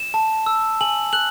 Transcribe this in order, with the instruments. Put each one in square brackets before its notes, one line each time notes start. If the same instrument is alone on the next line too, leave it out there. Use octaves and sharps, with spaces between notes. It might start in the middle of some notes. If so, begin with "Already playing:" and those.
Already playing: [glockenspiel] E7
A5
E6
G#5 F#7
F#6 F#7